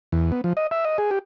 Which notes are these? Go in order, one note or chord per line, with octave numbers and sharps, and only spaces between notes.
E2
B3
F3
D#5
E5
D#5
G#4
G4